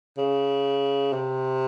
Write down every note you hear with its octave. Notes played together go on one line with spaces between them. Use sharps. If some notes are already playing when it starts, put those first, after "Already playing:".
C#3
C3